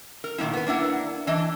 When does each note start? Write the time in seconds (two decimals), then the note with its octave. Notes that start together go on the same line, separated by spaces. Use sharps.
0.24 A#4
0.38 A#2 D#3 A#3 D#4 E4
0.53 B3 B4
0.67 A#3 D4 E4 F#5
1.27 E3 D4 D#5 A5